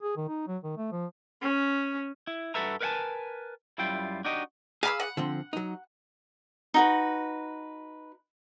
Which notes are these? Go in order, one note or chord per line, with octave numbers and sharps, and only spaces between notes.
G#4
D#3
D#4
F#3
D#3
A3
F3
C#4
E4
G2 F#4 A4 B4 E5 A#5
A#4 B4 D#5 F#5 G#5 A5
F#2 G3 E4 F4 G5
D4 D#4 F#4 G4 D#5
G#4 F5 B5 E6
F#5
D3 F3 C4
F#3 D#4
D#4 F#4 B4